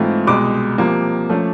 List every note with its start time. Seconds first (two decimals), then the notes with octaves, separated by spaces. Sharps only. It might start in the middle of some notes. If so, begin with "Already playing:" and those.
Already playing: G#2 E3 A3 C4 F4
0.27 C2 B2 G#3 D6
0.78 C3 F3 A#3
1.29 F3 A3 C#4